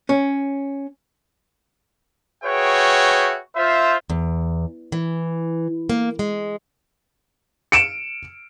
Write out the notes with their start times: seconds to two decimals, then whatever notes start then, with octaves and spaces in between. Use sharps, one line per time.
0.09 C#4
2.44 F#4 G#4 B4 C#5 E5 G5
3.56 F4 C5 E5
4.10 E2
4.92 E3
5.90 A#3
6.19 G#3
7.72 C#7 D7 E7